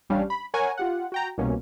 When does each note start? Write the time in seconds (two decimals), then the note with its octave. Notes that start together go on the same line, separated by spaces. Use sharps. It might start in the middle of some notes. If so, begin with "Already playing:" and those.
0.09 A1 G3 C#4 D4 F5
0.30 B5
0.54 A#4 C#5 F#5 G#5 A#5 C#6
0.78 F4 G4 F#5
1.12 F#4 G5 A#5
1.38 C2 B2 A#3 C#4